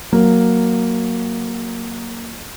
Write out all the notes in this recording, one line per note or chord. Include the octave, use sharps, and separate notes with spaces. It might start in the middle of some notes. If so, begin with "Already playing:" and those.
F#3 A#3